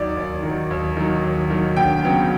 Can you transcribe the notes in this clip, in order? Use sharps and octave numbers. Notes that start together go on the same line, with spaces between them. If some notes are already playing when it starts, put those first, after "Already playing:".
Already playing: D#2 D#3 F#3 D5
D#2
D#3 F#3
D#2
D#3 F#3
D#2
D#3 F#3
D2 G5
C#3 F#3 B3